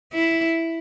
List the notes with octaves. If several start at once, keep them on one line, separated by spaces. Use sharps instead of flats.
E4